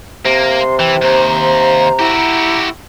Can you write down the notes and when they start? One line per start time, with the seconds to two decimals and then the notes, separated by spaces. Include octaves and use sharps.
0.25 C3 A#3
0.60 C6
0.79 E3 G5
1.02 D#2 C5 A#5
1.99 E4 F#4 G4